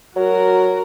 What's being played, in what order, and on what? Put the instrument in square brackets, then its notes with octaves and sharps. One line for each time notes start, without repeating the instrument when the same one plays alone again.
[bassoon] F#3 [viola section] F#4 A#4